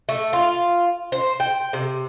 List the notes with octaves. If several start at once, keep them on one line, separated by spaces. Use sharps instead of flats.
A3
F4
C5
G5
C3